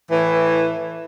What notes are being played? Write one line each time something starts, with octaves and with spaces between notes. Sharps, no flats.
A2 E3